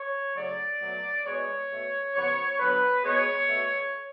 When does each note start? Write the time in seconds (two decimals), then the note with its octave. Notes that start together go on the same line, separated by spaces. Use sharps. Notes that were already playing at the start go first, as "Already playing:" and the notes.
Already playing: C#5
0.36 C#3 F#3 A3 D5
0.81 B2 F#3 A3
1.25 B2 G#3 B3 C#5
1.70 B2 A3
2.14 C#3 F3 B3 C#5
2.59 D3 F#3 B3 B4
3.04 B2 G#3 B3 C#5
3.48 B2 A3